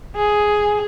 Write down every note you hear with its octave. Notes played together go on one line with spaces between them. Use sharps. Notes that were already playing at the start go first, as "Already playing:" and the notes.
G#4